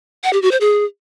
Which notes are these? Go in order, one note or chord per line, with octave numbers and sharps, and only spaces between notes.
F#5
G4
F#4
C5
G#4